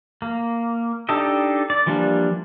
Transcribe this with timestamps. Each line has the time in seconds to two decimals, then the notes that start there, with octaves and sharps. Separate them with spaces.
0.22 A#3
1.09 D4 D#4 G4 A4 D#5
1.70 D5
1.86 E3 F3 G3 A#3 D4